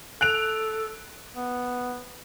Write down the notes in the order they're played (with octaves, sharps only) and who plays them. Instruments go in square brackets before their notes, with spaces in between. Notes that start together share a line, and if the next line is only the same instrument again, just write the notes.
[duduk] A4 [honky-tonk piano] F#6 D7 F7
[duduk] B3